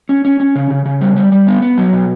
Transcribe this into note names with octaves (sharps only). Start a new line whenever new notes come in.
C#4
C#4
C#4
C#3
C#3
C#3
G3
G3
G3
B3
B3
F#3
B2